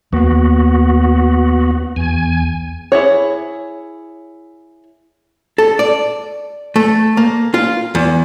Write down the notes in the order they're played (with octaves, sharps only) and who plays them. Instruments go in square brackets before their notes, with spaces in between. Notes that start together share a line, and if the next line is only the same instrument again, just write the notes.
[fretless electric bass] D#2 A#3 [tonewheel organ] B3 F#4
[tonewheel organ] E2 G#5
[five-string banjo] E4 G#4 C#5
[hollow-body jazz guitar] A4
D5
A3
A#3
F4
E2